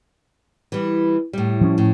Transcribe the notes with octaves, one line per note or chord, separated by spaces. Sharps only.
E3 G3
A2 G3
F3 C#4
A2